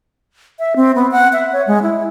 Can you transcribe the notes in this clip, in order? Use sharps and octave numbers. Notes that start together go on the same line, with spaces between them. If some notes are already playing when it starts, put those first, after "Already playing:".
E5
C4
B3
F#5
E5
C#5
G#3
E4